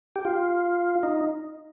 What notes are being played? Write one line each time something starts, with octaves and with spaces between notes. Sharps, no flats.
G4
F4
D#4